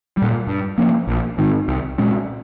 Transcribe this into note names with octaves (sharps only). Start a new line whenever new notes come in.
A#2 G3
G2
F3 A#3 C#4
A#1
G#2 D#3
C2
A#2 G#3 C#4